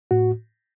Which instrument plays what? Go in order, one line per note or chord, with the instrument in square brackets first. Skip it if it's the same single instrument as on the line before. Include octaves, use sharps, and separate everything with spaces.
[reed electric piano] A2 F#4